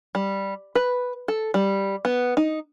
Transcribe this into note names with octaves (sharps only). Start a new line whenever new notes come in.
G3
B4
A4
G3
B3
D#4